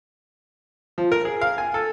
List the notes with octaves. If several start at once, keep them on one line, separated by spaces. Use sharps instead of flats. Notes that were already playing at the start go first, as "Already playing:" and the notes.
F3
A#4
G#4
F5
G#5
A4